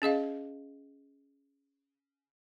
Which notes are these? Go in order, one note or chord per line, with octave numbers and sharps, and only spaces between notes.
C#4 G#4 D#5 F5